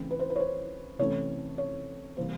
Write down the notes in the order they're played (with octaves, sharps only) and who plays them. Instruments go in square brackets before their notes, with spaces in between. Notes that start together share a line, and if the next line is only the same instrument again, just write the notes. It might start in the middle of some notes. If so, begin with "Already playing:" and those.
Already playing: [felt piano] C#3 E3 A3 C4
B4
C5
B4
C#5
C5
C3 E3 A3 C#4 C#5
C#5
C3 E3 G3 A#3 C5